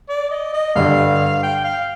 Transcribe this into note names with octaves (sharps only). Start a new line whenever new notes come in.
D5
D#5
D#5
G2 D3 G3 F5
G5
F5